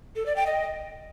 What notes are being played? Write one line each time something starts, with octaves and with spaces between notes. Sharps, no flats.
A4
D5
G5
D#5